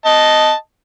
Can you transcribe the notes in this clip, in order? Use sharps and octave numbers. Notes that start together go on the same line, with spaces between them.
D#5 A5